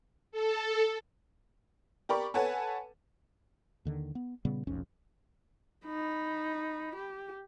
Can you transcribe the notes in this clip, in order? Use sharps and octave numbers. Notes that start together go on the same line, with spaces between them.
A4
G4 A#4 D5 B5 C#6
A4 B4 C#5 F#5 G#5 A5
D#2 D3 D#3
B3
A#2 C#3 G3 B3
F1 B1 F2 C#4
D#4 B5
G4